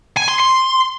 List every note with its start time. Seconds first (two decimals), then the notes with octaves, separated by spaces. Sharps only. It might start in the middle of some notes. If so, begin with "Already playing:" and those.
0.17 G#5
0.28 C6
0.40 C6